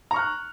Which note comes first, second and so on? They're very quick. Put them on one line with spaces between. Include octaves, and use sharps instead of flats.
A#5 C#6 F6 F#6